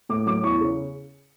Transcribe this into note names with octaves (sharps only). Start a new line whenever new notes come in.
A2 D6
F#3 D6
E2 C#6
C#3